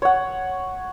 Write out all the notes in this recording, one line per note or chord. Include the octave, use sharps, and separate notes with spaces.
C#5 F#5